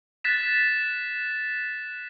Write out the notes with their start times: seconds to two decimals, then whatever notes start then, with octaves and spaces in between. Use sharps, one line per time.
0.24 F#6 A6 B6 E7